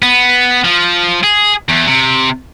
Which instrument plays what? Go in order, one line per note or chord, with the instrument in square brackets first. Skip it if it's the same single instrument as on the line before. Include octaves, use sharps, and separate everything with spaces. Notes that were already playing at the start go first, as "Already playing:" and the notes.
[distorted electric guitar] B3
F3
G#4
E2
C3